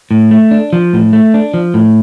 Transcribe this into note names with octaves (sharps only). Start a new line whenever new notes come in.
A2
A3
D4
F3
A2
A3
D4
F3
A2